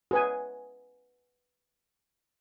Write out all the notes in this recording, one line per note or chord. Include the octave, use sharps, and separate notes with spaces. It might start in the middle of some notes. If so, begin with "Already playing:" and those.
G#4 B4 G#5